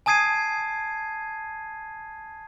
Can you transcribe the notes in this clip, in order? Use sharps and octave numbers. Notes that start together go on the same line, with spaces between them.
G#5 A5 D#6 G#6 C7 D#7